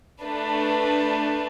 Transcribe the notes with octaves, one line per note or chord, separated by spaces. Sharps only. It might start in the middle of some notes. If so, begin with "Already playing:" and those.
A3 D4 B4